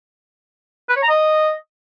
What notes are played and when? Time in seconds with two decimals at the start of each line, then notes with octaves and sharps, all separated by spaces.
0.89 B4
0.96 C#5
1.03 A#5
1.09 D#5